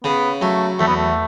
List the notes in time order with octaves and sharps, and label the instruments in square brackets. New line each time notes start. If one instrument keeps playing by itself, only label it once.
[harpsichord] C#3 [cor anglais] B3
[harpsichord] F#3 [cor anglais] A3
[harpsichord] E2 [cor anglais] A3
[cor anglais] B3
A3